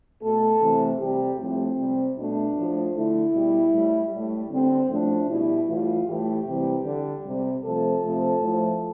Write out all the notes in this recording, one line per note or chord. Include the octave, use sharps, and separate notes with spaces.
B2 A3 A4
C3 E3 A3
C3 G3 G4
A2 F3 A3 C4
C3 G3
B2 A3 D4
A2 F3 A3
D3 A3 E4
B2 G3
A2 G3
A2 G3
D3 G3 C4
A2 F3 A3 D4
B2 G3 E4
A2 E3 G3 F4
A2 E3 A3 G4
C3 E3 G3
D3 G3
C3 G3
C3 F3 A3 A4
C3 F3 A3
A2 F3 A3